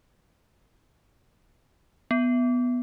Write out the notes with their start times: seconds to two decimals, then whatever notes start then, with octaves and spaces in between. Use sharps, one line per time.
2.11 B3